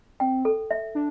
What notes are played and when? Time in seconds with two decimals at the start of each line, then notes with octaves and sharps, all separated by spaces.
0.20 C4 G5
0.45 A4
0.71 E5
0.95 D4